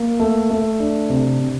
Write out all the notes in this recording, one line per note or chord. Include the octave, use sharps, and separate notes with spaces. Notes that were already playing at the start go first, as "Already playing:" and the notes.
Already playing: A#3
A3
A3
D4
C3
C3